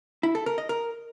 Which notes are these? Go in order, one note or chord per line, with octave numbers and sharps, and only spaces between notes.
E4
A4
A#4
D#5
A#4